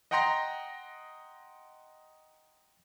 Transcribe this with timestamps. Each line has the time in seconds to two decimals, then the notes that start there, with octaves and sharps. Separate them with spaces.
0.11 D#5 F#5 G5 A#5 C6 A#6